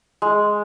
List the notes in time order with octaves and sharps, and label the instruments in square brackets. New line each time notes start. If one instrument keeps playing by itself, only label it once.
[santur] G#3